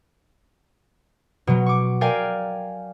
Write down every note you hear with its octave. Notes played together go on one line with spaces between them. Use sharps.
B2 F#3
C#6 D6
A#4 D5 F5 G5 G#5